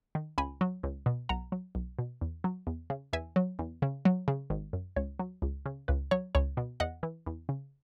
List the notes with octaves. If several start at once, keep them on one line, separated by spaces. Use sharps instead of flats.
D#3
C#2 G#5 B5
F#3
C#2
B2
B1 F#5 A#5
F#3
B1
B2
E2
F#3
E2
C#3
E2 E5 G#5
F#3
E2
C#3
F#3
C#3
G#1
F#2
C#2 C#5
F#3
C#2
C#3
C#2 B4
F#3 C#5
C#2 C#5
B2
E2 D#5 F#5
E3
E2
C#3